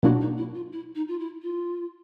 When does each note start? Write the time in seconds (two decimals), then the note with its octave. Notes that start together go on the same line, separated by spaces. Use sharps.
0.03 B2 F#3 A#3 D4 E4 F#4
0.21 D#4
0.38 E4
0.55 F4
0.73 E4
0.95 D#4
1.08 F4
1.19 E4
1.42 F4